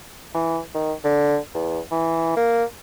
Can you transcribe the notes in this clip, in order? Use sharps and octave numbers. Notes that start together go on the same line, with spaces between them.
E3
D#3
D3
E2
E3
A#3